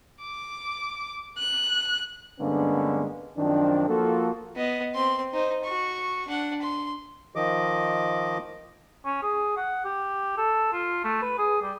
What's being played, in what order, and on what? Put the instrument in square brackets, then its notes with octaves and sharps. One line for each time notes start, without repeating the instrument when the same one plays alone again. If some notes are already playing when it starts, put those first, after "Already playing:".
[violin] D6
F#6
[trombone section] G2 D3 G#3 A#3 B3 C#4
F#2 D#3 F3 C4 D4
F3 A#3 F4 F#4 A4
[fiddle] B3 D#5
C4 C6
D#4 C5
F#4 C#6
D4 F#5
C6
[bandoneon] D#3 F3 D#5 D6
[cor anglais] C#4
G#4
F#5
G4
A4
F4
A3
B4
G#4
G3